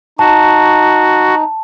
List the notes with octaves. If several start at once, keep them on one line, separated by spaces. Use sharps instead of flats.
D#4 F#4 A5